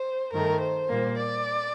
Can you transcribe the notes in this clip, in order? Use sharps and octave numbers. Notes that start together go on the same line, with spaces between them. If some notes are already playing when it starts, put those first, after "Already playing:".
Already playing: C5
G2 D#3 A3 A#4
C5
A#2 G3 A#3
D5